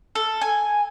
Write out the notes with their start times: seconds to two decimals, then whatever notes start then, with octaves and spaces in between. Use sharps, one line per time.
0.15 A4
0.41 G#5